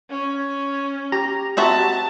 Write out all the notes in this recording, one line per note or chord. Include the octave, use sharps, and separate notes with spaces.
C#4
G4 A#5
C4 F#4 E5 A5